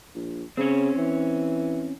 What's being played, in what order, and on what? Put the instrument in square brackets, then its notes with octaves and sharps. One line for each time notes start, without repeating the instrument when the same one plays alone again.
[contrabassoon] A#1
[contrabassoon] C#3 [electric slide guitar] C4 C#4
[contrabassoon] E3